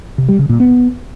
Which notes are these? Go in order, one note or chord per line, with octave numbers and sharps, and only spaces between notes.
C3
G3
C#3
A#2
B3